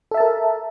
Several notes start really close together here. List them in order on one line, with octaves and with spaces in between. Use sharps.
A4 E5 A5 A#4